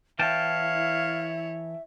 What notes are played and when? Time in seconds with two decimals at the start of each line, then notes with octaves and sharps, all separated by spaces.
0.19 E3 E4 C#5 E5 F5 G5 A5